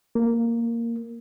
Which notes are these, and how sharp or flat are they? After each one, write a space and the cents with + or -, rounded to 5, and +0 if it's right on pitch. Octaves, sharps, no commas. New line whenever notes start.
A#3 -5